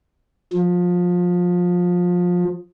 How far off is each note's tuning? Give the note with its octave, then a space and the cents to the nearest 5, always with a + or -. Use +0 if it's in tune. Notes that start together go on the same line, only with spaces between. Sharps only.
F3 +25